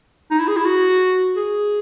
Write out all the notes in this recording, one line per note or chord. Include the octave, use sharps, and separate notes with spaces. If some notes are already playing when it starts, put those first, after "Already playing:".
D#4
E4
G#4
E4
F#4
G#4